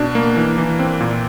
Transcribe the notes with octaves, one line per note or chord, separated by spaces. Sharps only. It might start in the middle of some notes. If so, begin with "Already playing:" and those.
Already playing: B2 D4
A#3
E3
E3
C4
A#2